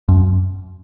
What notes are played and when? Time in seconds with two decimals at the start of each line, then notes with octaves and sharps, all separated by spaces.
0.09 F#2